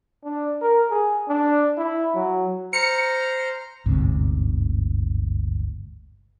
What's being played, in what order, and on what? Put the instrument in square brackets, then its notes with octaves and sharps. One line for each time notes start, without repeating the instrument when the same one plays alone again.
[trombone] D4
A#4
G#4
D4
E4
F#3
[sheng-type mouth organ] C5 A#5 F6 [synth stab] C#7
[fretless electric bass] G1 D2 G#2 C3